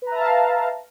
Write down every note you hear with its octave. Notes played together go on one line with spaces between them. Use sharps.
B4 E5 F5 A5 A#5